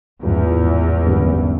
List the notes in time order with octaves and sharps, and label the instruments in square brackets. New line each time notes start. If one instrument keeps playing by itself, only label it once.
[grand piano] A1 G#2 F3 G#3 B3 [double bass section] E2
[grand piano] G#1 F#2 D3 G3 B3